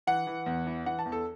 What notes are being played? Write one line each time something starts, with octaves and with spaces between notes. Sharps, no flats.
E3 F#5
E3
E2
E3
E3 F#5
A5
E2
A4